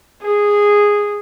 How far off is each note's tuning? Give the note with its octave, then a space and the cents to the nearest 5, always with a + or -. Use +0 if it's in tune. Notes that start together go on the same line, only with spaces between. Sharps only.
G#4 -10